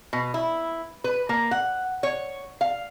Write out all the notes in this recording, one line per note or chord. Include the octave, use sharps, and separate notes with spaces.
B2
E4
B4
A#3
F#5
C#5
F5